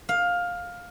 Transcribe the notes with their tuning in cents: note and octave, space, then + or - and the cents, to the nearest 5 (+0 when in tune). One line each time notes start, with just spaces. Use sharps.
F5 +15